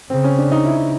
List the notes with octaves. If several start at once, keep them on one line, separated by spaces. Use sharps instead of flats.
C#3 C4
C#4
D4
D#4
E4